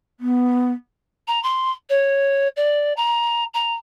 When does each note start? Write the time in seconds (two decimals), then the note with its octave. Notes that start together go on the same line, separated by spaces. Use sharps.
0.20 B3
1.27 A#5
1.43 C6
1.89 C#5
2.56 D5
2.96 A#5
3.54 A#5